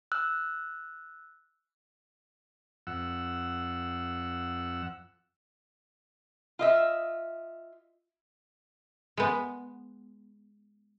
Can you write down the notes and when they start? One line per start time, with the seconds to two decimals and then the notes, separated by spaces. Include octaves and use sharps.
0.12 E6 F#6
2.87 F2 F#5 E6
6.59 F4 D#5 E5
9.17 G#3 B3